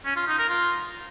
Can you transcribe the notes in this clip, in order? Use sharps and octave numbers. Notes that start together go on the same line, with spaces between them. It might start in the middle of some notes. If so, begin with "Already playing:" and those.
C#4
F4
D#4
A#4
F4